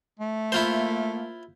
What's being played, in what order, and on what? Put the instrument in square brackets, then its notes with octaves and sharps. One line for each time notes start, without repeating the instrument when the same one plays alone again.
[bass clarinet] A3
[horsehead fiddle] A#3 [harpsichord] E4 F4 C5